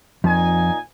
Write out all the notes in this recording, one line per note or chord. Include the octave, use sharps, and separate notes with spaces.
F2 A#2 D#4 G#5